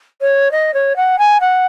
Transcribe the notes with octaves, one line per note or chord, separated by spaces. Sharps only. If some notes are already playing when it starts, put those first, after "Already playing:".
C#5
D#5
C#5
F#5
G#5
F#5